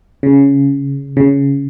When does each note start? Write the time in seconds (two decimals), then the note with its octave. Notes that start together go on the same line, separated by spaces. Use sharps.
0.23 C#3
1.17 C#3